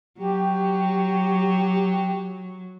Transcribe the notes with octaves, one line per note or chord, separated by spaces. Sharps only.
F#3 G4